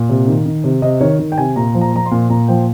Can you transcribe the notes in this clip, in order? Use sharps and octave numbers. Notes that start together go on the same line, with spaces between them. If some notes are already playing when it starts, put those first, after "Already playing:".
Already playing: A#2
C3
D#3
D#3
C3
C3 D#5
D#3 C#5
D#3
G5
C3 G#5
A#2 A#5
F3
A#5
F3 A#5
C6
A#2
A#2 A#5
F3 G5